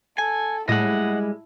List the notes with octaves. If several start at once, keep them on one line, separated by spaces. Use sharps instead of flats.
A4 G#5
A2 G3 G#3 E4 D#5 F#5